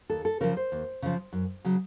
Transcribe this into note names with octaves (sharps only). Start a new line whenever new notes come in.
D#2 A4
A4
C#3 F3 A#4
C5
D#2
C#3 F3
F#2
C#3 F#3